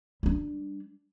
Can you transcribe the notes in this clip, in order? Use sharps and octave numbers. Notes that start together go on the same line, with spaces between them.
G3 D4